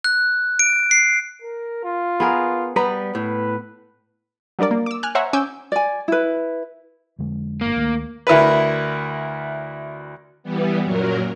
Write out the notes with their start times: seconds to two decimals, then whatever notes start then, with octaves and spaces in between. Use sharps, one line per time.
0.04 F#6
0.59 D7
0.91 C7
1.42 A#4
1.84 F4
2.20 B3 G#4 A#4
2.76 G3 B3 B4 A#5
3.15 A2 B4
4.59 F#3 G3 D4 A#4 D5
4.71 A#3
4.86 D6 E6
5.03 G#5 F6 F#6
5.15 C5 C#5 E5 F#5 G#5 A#5
5.33 C#4 G#5 D6 E6 G6
5.72 D5 G#5
6.08 E4 B4
7.19 F2 D3 G#3
7.61 D1 G1 A#3
7.76 D2 D#3 A3
8.27 D2 E4 A#4 B4
10.43 E3 G3 B3
10.82 F#2 A#2 F#3 A#4